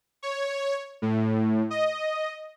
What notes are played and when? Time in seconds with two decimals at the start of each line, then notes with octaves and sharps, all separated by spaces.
0.23 C#5
1.02 A2
1.70 D#5